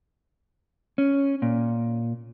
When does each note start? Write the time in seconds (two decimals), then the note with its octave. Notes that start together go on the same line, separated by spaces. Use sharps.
0.98 C#4
1.42 A#2